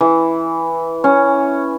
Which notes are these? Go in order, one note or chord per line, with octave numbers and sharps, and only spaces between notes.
E3
C#4